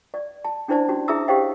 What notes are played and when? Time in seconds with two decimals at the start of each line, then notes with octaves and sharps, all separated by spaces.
0.14 D5
0.45 A5
0.68 C#4 D4 E4 C5 D5 A5
0.88 C#4 F#4
1.08 E4 G#4 E5 A#5 D#6 E6
1.28 G4 C5 C#5 D#5 F5 G5